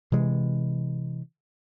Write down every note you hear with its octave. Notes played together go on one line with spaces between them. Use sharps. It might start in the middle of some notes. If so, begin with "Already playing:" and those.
C3 E3 G#3